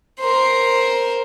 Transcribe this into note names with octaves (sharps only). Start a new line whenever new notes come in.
A#4 C5